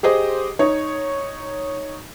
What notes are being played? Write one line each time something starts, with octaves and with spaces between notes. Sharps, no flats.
G4 G#4 C5 D#5
D#4 C#5